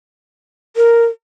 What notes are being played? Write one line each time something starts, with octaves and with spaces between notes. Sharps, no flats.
A#4